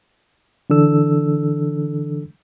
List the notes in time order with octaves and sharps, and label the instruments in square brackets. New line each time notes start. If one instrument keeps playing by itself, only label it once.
[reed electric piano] D3 E3 D4 A4 E6